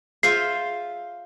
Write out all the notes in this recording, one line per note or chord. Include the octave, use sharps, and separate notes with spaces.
F4 G#4 C5 E5 C7